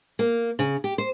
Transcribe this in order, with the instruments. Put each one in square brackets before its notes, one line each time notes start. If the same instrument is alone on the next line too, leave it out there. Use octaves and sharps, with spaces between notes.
[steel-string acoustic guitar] A#3
C#3
G4
C5